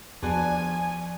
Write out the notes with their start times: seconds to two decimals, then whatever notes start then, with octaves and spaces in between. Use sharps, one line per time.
0.23 E2 F3 D4 F#4 D5 G#5